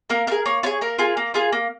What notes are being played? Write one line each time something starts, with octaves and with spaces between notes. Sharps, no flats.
A#3 A#4
F4 G#4 A#4
A#3 C#5
F4 G#4 C#5
A#3 A#4
F4 G#4
A#3
F4 G#4
A#3